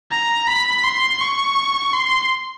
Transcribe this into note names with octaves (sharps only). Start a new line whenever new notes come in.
A#5
B5
C6
C#6
C6